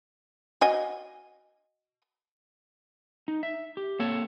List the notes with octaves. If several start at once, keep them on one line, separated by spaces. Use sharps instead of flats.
F#4 D#5 G#5
D#4
E5
G4
A#3 C4 A4 C#5 A5